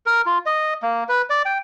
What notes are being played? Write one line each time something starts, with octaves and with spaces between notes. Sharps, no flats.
A#4
F4
D#5
A#3
B4
D5
G5